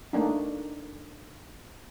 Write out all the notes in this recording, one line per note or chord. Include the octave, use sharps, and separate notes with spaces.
A3 A#3 D4 D#4